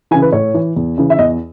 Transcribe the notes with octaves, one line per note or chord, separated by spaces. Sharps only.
C#3 E3 G#5
B4
A2 C#5
E3
E2
C#3 E3
E5
E2 D#5